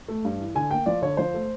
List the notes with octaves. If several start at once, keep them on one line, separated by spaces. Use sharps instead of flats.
A3
G2
E3
D3 G#5
A#3 G5
F3 D5
D3 C#5
F3 C5
A3